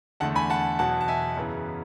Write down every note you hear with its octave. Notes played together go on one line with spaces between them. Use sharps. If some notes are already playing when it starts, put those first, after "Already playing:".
E2 D3 A3 F#5 A5
G#5 B5
F#5 A5
E2 B2 F#3 F#5 A5
A5
E5 G#5
F#2 C#3 E3 B3